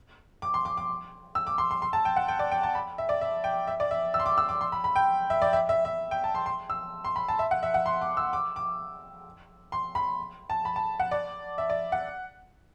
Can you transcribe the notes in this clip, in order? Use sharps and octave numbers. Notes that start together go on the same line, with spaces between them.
D6
C6
D6
D6
E6
D6
C6
C6
C6
A5
G5
F#5
G5
D5
G5
A5
B5
E5
D5
E5
G5
E5
D5
E5
E6
C6
D6
E6
D6
C6
B5
B5
G5
E5
D5
E5
E5
E5
G5
A5
C6
C6
E6
C6
B5
A5
E5
F#5
E5
F#5
C6
D6
E6
D6
D6
C6
B5
A5
B5
A5
F#5
D5
E5
D5
F#5